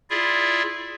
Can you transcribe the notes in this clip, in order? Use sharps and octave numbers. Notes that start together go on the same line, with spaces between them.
E4 F4 G#4 D5 E5